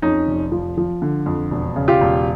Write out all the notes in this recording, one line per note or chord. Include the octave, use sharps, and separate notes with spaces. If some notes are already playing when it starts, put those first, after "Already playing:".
F2 C#4 D#4
F1
F3
F3
D3
F2
E1
C#3
F4 G4
E1